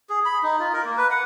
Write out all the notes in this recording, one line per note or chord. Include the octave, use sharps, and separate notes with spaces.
G#4
B5
D#4
F4
A#4
A#3
B4
F#5